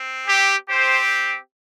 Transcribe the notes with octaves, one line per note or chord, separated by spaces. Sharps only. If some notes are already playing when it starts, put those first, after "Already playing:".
Already playing: C4
G4
C4 G4 C5